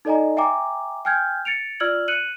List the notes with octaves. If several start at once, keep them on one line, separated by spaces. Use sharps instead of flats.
D#4 A4 D5 D#5 G#5 A#5
E5 G5 G#5 A#5 D6
G5 G#5 F6 G6 G#6
A6 C#7 D7 F7
F4 D5 E6 F6 G#6 F#7
F#6 C#7 D#7 F#7